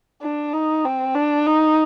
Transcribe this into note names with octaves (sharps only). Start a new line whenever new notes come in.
D4
D#4
C4
D4
D#4